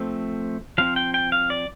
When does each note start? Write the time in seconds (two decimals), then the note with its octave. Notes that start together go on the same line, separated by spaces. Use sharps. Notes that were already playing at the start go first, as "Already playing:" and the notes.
Already playing: F3 A3 C4
0.78 F3 C4 F5
0.96 G5
1.14 G5
1.32 F5
1.50 D5